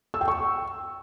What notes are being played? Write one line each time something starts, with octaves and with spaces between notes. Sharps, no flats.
E6
G5
C#6